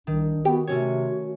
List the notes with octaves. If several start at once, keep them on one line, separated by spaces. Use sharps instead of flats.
C2 D#3 D4
B3 F#4 G4
C3 A3 C#4 F#4 C#5